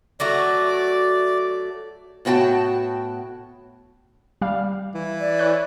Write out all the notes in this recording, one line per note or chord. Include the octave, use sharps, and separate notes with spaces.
F#3 A3 F#4 D5
A2 B3 F#4 G5 A5
G3 F5
E3
D5
C#5 F#6